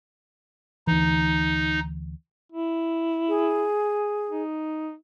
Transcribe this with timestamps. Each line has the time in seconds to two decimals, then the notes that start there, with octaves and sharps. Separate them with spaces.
0.87 D2 E3 D#4
2.52 E4
3.29 G#4
4.30 D#4